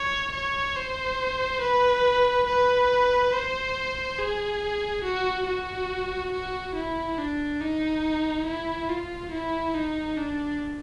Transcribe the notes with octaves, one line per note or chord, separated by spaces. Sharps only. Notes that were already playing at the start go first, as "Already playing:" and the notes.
Already playing: C#5
C#5
C5
B4
B4
C5
G#4
F#4
F#4
F#4
E4
D4
D#4
E4
F4
E4
D#4
D4